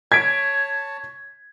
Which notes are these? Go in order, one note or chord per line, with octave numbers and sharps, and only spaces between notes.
C#5 A5 G#6 B6 D7